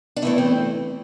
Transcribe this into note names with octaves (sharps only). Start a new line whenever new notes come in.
D4
E2 E3 A3 E4
C4